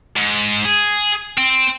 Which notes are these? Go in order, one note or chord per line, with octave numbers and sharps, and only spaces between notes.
G#2
G#4
C4